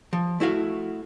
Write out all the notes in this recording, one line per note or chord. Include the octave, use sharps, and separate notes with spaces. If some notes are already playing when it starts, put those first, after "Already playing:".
F3
A3 E4 F#4 F5